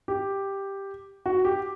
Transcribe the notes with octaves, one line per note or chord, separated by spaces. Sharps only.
G4
F#4
G4